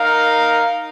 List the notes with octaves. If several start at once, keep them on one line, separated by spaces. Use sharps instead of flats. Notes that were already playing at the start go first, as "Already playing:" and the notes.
Already playing: D#4 A#4 F5